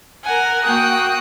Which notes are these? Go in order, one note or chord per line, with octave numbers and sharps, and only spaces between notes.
A#4 F#5 G#5
A#3 F#4 G5 D#6 F#6